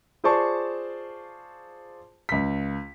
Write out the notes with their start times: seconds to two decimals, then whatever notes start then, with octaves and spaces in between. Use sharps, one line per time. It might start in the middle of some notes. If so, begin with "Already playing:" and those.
0.24 F4 G#4 C5 D5 A5 C#6
2.29 C#2 B6